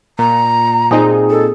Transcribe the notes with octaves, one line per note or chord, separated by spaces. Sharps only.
A#2 A#5
A#2 C4 D#4 G#4
A4